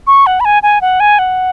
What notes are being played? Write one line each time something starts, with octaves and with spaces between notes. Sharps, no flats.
C#6
F#5
B5
G#5
G#5
F#5
G#5
F#5